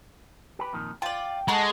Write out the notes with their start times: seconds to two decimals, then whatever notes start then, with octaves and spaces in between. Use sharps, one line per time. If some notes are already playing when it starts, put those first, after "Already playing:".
0.59 G4 B4
0.73 F2 A#2 D#3
1.02 F4 D5 G5
1.48 G#3 A4 F#5 A5 A#5 C#6